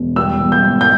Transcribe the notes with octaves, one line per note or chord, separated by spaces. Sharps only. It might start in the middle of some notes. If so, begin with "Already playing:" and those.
Already playing: E1
G3 E6
E2
G6
E2
G6